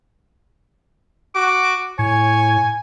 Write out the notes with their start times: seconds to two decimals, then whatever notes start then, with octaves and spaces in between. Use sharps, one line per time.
1.35 F#4 D6
1.99 A2 C#5 G#5